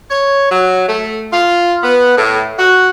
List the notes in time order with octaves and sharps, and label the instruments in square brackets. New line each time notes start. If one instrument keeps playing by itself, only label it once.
[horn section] C#5
F#3
A3
F4
B3
A2
F#4